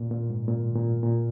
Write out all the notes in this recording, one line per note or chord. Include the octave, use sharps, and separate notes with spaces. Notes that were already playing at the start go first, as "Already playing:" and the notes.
Already playing: A#2
A#2
G#2
A#2
A#2
A#2